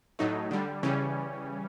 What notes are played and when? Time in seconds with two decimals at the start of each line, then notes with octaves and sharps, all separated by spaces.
0.19 A2 F#3 A3 D#4
0.51 D3 G3
0.83 C#3 E3 G3 C#4